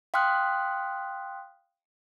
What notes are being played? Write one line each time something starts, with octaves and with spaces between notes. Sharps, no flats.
F5 G5 C6 D#6 F6 F#6